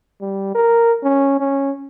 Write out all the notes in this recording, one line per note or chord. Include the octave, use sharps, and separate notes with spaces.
G3
A#4
C#4
C#4